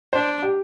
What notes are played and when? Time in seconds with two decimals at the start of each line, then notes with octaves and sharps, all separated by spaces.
0.13 D4 C5
0.42 G4